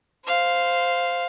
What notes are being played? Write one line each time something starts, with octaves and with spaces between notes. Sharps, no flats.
C5 F5